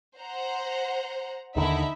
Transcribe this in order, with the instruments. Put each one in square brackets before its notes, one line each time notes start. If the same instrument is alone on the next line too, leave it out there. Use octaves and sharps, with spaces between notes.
[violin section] C5 F#5 A#5
[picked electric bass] D#2 D3 D#3 [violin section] D#4 E4 E5